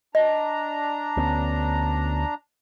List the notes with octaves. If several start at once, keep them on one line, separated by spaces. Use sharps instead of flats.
D4 D#5 A#5
D2 B3 C#4